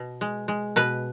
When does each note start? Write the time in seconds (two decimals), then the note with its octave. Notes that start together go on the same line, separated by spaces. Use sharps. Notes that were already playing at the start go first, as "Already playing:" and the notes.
Already playing: B2
0.21 G#3
0.48 G#3
0.76 B2 B4